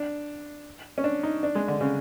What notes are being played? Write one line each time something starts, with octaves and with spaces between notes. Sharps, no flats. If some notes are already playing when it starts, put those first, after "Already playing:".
Already playing: D4
C#4
D4
D#4
D4
G#3
D3
C#3